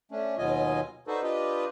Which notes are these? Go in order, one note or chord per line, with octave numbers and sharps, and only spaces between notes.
A3 C#4 D4
D#2 B2 F#3 F4 D#5 G#5
D4 D#4 F#4 A4 B4 C5
D4 F4 G4 B4 D#5